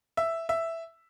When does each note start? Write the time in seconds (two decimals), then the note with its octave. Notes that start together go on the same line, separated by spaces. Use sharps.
0.17 E5
0.49 E5